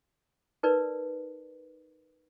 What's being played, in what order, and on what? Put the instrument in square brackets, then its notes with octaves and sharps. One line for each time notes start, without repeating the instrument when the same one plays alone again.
[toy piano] D#4 A#4 B4 D5